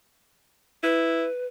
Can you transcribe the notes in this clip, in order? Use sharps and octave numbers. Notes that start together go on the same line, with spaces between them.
E4 B4